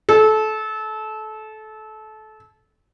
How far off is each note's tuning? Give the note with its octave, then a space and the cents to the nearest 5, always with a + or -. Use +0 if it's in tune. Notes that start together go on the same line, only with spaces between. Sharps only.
A4 -25